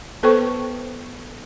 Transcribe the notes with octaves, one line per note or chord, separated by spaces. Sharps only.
B3 A4 B4 C5 G5 C#6